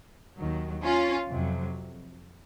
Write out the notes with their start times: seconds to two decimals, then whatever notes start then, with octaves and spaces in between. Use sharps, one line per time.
0.37 D#2 D#3 F#3
0.84 C#4 F4
1.30 F2 C3 F#3